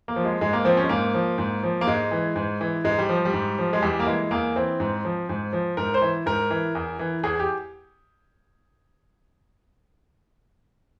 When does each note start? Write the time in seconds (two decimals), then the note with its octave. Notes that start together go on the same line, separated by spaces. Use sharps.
0.08 A#3
0.16 F3
0.25 G#3
0.41 G#2 G#3
0.53 A#3
0.65 F3 C4
0.77 C#4
0.84 G#3
0.89 G#2 A#3
1.14 F3
1.38 G#2
1.63 F3
1.81 A#3
1.87 G#2 G#3
2.11 E3
2.36 G#2
2.61 E3
2.84 G#2 G#3
2.98 G3
3.09 F3
3.25 G3
3.33 G#2
3.59 F3
3.73 G#3
3.82 E2 G3
4.00 A#3
4.07 E3 G#3
4.31 E2 A#3
4.56 E3 C4
4.80 G#2
5.05 F3
5.29 G#2
5.53 F3
5.77 G#2 A#4
5.94 C5
6.02 E3
6.26 G#2 A#4
6.51 E3
6.75 E2
6.99 E3
7.23 E2 G#4
7.40 G4